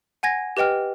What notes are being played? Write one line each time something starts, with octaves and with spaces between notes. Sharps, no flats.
F#5 G#5 G#6 A#6
G4 B4 D#5 G5 F6